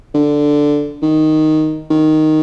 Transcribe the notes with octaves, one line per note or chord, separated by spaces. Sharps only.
D3
D#3
D#3